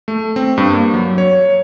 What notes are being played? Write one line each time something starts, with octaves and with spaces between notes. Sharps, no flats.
A3
C4
G2
A#3
F#3
C#5